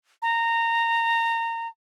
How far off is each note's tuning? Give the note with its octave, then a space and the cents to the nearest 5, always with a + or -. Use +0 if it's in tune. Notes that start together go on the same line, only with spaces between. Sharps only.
A#5 -20